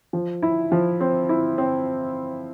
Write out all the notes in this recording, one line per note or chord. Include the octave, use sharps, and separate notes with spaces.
F3
E4
F3
C4
E4
C4